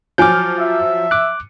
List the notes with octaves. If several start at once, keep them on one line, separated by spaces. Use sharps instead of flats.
F3 F#3 C5 G#5 D6 F6 G6
E5
D6 F#6